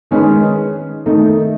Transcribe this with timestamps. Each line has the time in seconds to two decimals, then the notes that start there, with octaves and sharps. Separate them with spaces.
0.11 D#3 G#3 C#4 G#4 B4
1.06 D#3 A3 D#4